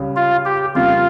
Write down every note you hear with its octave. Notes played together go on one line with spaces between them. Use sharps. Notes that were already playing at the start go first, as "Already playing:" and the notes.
Already playing: C#2 C#3 G3 C#4
F4
G4
F2 C#3 G3 A#3 F4